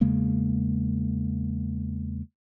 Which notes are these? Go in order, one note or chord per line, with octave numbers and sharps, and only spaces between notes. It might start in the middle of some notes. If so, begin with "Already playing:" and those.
E2 C#3 G#3 A#3